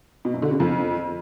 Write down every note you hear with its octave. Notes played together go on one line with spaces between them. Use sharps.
B2
F#2
D3
C#3
F2